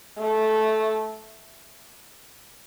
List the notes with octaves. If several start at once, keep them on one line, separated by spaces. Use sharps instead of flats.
A3